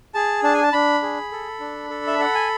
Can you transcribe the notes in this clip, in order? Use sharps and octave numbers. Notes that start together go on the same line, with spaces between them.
G#4 A5
D4 A5
G#5
A5
D4 B5
G#4
A4
D4
A4
E5
A4 F#5
G#5